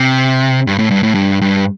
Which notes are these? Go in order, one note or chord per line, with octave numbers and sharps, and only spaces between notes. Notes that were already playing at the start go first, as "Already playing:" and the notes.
Already playing: C3
G2
A2
G2
A2
G2
G2